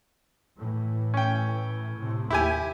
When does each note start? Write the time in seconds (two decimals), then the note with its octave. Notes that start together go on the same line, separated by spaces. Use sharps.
0.58 A2 E3
1.14 C#4 G5
1.97 A2 C3
2.30 D#2 E4 G4 G#5